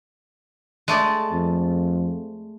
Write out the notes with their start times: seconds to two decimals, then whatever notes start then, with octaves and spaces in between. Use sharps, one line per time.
0.88 G#3 A3 D5
1.32 F2